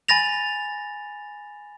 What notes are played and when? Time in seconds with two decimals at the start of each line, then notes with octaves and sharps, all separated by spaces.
0.08 G#5 B5 A6 A#6 F7